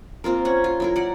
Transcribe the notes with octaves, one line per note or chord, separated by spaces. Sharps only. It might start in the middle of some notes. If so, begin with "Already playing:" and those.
A#3 C4 F4 A#4
C#4 F#5
F4
F#3 E4 A#4
D5 F#5